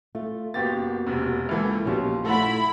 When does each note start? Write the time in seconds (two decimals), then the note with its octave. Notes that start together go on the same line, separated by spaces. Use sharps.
0.15 A3 F4
0.54 F#1 A#3 B3 F#4 G4 A6
1.06 E1 C3
1.49 C#2 E3 A#3 E4 A4
1.85 A#1 D#2 B2 C#4 F4 G4
2.25 A3 D#4 E4 A4 F#5 B5